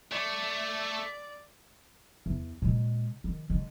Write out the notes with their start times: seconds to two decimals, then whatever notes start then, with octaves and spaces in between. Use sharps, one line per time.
0.11 A3 D5
2.26 E2
2.62 A#2 G#3
3.24 D#3
3.50 D3 G#3